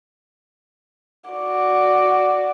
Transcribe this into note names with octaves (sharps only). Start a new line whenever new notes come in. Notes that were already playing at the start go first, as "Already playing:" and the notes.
F#4 D5